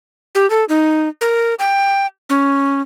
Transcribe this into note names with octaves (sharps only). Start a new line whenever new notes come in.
G4
A4
D#4
A#4
G5
C#4